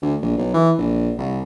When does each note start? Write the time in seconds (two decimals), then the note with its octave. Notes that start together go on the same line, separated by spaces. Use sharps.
0.02 D2
0.22 A#1
0.38 B1
0.54 E3
0.78 A#1
1.18 C2